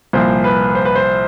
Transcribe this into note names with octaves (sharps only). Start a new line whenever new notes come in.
C2 A#2 F3 C5
B4
C5
B4
C5